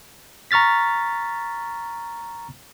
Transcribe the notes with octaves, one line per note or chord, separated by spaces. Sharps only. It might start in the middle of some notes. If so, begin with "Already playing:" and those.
A#5 C#6 F6 A6 B6